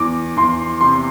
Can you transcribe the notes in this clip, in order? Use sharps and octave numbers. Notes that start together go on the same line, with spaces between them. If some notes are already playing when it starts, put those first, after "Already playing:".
Already playing: E2 D6
E2 C6
C3 C6